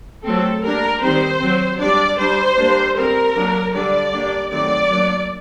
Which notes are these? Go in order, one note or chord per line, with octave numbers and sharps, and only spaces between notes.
F#3 A3 C4 A4
G3 A#3 D4 A#4
D#3 G3 C4 C5
F#3 C4
G3 D4 D5
G3 D4 C5
G3 A#3 D4
G3 C4 A#4
F#3 A#3 D4
D3 G3 D4 D5
G3 A#3 D4
D#3 F#3 A3 C4 D5
F#3 A#3 D4